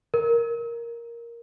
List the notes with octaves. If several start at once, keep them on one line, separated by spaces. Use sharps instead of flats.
A#4